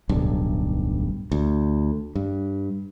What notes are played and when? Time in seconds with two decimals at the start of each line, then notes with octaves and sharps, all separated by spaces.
0.09 D1 B1 G2
1.32 D2
2.15 G2